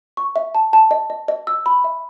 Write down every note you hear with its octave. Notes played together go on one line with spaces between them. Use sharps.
C#6
E5
A5
A5
D#5
D#5
D#5
E6
B5
E5